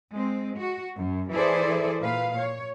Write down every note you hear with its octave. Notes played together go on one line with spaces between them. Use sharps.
G#3 C4
F#4
F#2
E3 E4 G#4 A4 C5 D5
A#2 B4 F5
C#5